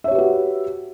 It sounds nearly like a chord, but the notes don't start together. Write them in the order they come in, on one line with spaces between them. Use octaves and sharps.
E5 C#5 G4 B4 F#4